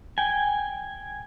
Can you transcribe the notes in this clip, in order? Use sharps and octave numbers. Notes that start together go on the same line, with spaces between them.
G5 G#5